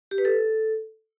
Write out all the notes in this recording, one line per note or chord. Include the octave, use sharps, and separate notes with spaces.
G4
B4
A4